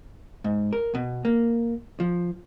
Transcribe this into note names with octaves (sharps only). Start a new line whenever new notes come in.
G#2
A#4
B2
A#3
F3